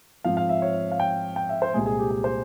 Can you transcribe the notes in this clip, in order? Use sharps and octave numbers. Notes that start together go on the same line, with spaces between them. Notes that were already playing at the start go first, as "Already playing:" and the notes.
G#2 F3 C4 F5
F5
E5
C#5
F5
G5
G5
E5
C5
C2 A#2 G#3 G#4
G#4
G4
G#4
C5